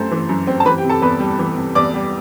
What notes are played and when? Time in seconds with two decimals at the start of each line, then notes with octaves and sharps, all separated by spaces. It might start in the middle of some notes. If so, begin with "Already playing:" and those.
Already playing: F#2 A3 C4 C5
0.12 E3
0.29 F#2
0.47 C4
0.60 A5
0.66 E3 B4 B5
0.78 G4 G5
0.84 C3
0.89 A4 A5
1.02 E2 B4 B5
1.20 G3
1.39 E3
1.57 C3
1.75 E2 D5 D6
1.94 G3